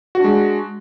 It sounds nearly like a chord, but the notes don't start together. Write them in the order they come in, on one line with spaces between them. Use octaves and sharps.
F#4 D4 G#3